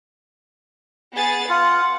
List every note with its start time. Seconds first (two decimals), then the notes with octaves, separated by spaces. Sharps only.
1.15 B3 G#4 A6
1.49 F4 F#5